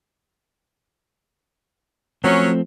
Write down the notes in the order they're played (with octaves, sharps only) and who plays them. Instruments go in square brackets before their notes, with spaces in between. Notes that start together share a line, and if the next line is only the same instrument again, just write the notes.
[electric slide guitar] F3 A3 C4 [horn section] F#3 C#4